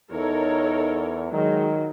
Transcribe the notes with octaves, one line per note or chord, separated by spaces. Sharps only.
E2 D#4 A4 A#4 C#5
D#3 F#3 G#3